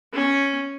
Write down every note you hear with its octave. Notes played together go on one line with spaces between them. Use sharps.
C#4